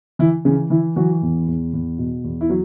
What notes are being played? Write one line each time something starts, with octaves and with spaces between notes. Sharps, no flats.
E3 E4
C#3 E3 C#4
E3 E4
E3 F#3 F#4
E2
E2
E2
B2
E2
E4
F#3